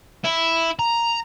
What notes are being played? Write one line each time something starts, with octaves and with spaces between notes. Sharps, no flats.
E4
A#5